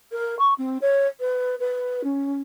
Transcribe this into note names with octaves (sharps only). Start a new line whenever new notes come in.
A#4
C#6
C4
C#5
B4
B4
C#4